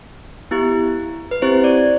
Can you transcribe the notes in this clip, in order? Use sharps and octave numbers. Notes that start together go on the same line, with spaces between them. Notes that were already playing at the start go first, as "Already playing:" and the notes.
B3 E4 G4
B4
C4 E4 G4 C5
D5